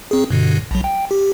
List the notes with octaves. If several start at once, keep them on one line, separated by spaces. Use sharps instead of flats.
C4 G#4
G2 B2 D3
A#1 F#3
G5
G4